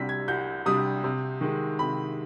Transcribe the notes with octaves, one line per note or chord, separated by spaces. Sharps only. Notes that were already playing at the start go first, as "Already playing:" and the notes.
Already playing: C2 C3 G3 D4 B6
G#6
C2 G6
C3 G3 D4 D#6
C3
D#3 G#3
C3 B5